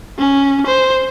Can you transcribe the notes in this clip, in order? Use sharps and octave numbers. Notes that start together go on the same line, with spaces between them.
C#4
C5